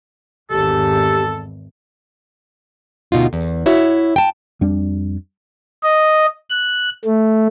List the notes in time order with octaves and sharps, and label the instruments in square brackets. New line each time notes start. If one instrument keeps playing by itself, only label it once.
[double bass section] G#1 E2 [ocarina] G4 [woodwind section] A4
[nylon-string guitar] D2 B2 D#4 F4
E2
E4 F#4 C#5 E5
G5 A5
[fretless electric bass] F2 G3 D4
[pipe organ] D#5
F#6
A3